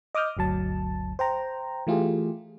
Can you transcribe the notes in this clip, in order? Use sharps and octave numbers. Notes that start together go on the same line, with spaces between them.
D#5 D6 D#6 F6 G6
G1 D2 F#3 A5
C5 G5 A#5
E3 A3 F4 G4 G#4